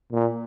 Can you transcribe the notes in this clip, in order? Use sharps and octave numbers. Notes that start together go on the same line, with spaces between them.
A#2